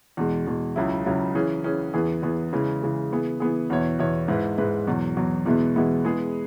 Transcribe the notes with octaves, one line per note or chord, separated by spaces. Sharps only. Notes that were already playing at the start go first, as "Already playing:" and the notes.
E2 B2 G#3
E2 B2 G#3
C#2 C#3 F#3 E4
C#2 C#3 F#3 E4
E3 C#4 G#4
E3 C#4 G#4
E2 E3 B3 G#4
E2 E3 B3 G#4
C#3 E3 G#3
C#3 E3 G#3
E3 B3 G#4
E3 B3 G#4
E2 B2 B3 E4 C#5
E2 B2 B3 E4 C#5
G#2 G#3 E4 B4
G#2 G#3 E4 B4
E2 B2 F#3
E2 B2 F#3
E2 B2 G#3 B3 E4
E2 B2 G#3 B3 E4
E3 G#3 B3 G#4